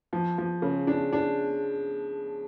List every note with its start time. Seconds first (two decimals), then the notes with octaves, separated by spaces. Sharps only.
0.13 F3
0.38 F3
0.62 C#3
0.87 D4
1.13 D4